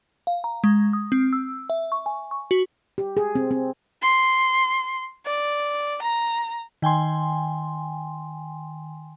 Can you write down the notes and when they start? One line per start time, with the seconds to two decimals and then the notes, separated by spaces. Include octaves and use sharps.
0.27 F5
0.44 A#5
0.64 G#3
0.93 D#6
1.12 C4
1.33 E6
1.70 E5
1.92 C#6
2.06 G#5
2.31 C#6
2.51 F#4
2.98 G4
3.17 G#4
3.35 C4
3.51 C4
4.02 C6
5.26 D5
6.02 A#5
6.82 D#3 G5 G#5 C6